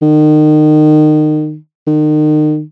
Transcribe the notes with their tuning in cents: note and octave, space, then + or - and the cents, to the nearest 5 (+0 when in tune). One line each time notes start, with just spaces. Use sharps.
D#3 -30
D#3 -35